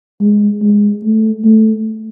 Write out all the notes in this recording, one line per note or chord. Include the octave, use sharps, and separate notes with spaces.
G#3
G#3
A3
A3